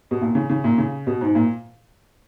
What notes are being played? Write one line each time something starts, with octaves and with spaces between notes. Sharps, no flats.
B2
A#2
C#3
C#3
A#2
C#3
B2
G#2
A#2